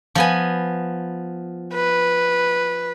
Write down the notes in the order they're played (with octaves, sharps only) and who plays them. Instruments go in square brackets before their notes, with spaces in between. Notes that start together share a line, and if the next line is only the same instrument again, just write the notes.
[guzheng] F3 B3 G#5
[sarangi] B4